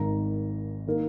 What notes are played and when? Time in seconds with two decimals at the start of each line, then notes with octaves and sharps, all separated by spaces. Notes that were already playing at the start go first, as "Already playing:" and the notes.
Already playing: G#1 G#2 D#3 A#5
0.87 D#3 A#3